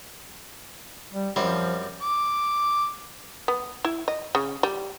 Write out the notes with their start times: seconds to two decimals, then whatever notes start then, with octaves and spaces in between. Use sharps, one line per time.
1.13 G3
1.36 F#2 F3 G3 C4
2.01 D6
3.48 B3
3.85 E4
4.08 D#5
4.35 C#3
4.63 G3